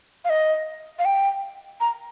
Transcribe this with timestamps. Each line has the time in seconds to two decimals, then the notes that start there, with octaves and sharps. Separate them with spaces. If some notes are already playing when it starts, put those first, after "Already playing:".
0.25 F5
0.30 D#5
0.99 F5
1.05 G5
1.81 A#5